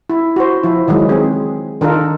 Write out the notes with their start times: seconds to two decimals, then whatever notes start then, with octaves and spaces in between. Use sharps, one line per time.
0.10 E4
0.36 F#4 C5
0.63 F3 E4
0.88 D#3 E3 F#3 G#3
1.09 C4 G#4
1.81 D#3 D4 D#4 F4 A4 A#4